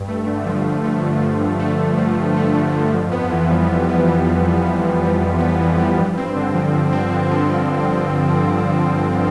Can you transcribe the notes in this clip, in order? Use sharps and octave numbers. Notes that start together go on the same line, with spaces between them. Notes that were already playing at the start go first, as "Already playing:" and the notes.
Already playing: G2
A3
D3
F3
G2
A3
D3
F3
G2
A3
D3
F3
G2
A3
D3
F3
F2
B3
E3
G3
F2
B3
E3
G3
F2
B3
E3
G3
F2
B3
E3
G3
G2
C4
D3
F3
G2
C4
D3
F3
G2